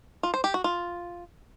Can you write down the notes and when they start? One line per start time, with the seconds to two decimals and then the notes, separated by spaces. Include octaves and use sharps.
0.23 F4
0.34 C5
0.44 G4
0.54 F#4
0.64 F4